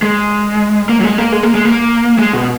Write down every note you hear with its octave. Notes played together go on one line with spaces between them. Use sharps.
G#3
A#3
F#3
G#3
A#3
G#3
A#3
G#3
A#3
G#3
B2